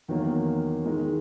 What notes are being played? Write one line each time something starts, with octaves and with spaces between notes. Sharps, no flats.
E2 D#3 F#3 A#3
D#3 G#3 D#4